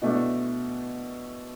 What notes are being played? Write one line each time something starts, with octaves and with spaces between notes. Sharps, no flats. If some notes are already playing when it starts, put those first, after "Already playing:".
B2 A3 D4